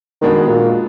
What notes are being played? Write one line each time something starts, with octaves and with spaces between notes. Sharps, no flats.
B2 D#3 G#3 B3 D4 F#4
A#2